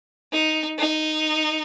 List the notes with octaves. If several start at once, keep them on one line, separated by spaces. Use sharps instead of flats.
D#4
D#4